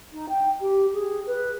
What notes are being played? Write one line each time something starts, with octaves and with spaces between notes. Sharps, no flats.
D#4
G5
G4
G#4
B4